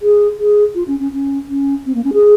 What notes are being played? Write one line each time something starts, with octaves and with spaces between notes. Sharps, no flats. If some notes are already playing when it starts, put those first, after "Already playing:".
G#4
G#4
F4
C#4
C#4
C#4
C#4
C4
A#3
C#4
G#4